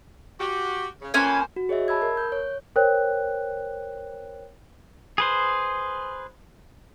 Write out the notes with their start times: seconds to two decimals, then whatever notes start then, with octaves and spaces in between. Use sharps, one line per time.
0.40 F#4 G4
1.02 C#3
1.14 F2 A#3 C#4 B4 C5 G#5
1.56 F#4
1.69 G#4 C#5 D#5 E5
1.88 A5 B5 E6 G#6
2.02 A#4
2.17 G6
2.32 C#5
2.76 A#4 C5 C#5 G5 F#6
5.18 G#4 B4 C5